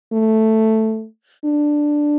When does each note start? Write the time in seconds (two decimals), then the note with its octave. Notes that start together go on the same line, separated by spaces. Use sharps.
0.13 A3
1.45 D4